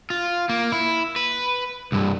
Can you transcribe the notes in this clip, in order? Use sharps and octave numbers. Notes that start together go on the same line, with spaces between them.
F4
A#3
E4
B4
C2 G2